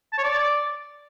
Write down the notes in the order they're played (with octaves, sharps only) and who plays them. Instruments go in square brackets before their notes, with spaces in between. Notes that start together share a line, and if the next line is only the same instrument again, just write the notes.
[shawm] A5
C#5
D5